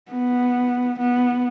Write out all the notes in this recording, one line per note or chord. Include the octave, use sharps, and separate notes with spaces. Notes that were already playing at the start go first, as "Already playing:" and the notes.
B3
B3